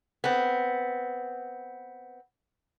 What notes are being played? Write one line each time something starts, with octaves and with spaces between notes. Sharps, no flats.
B3 C4